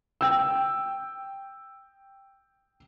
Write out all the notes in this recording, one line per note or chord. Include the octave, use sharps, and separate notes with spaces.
G5 E6